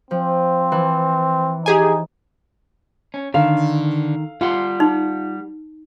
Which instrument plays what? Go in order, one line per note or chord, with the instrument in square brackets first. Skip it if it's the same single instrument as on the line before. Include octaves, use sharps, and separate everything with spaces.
[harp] F3 [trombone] C4
[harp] E3
[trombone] D#4 [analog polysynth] G4 G#4 G#5
[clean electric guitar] C#4
[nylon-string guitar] D3 [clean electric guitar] D#3 [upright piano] F5
[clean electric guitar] G3 F#5 C6 [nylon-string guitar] F4
[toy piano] D#4